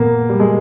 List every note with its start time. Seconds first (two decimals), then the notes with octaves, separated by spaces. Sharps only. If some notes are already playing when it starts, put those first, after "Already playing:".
Already playing: A#2 A#3 B3
0.29 G3
0.40 G#3